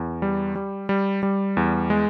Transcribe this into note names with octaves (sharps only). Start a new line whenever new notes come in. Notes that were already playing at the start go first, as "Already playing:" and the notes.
Already playing: E2
G3
G3
G3
G3
E2
G#3